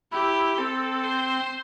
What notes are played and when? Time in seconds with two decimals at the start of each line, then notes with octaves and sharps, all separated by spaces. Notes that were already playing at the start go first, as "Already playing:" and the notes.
0.12 E4 G4
0.57 C4 A4
1.04 C5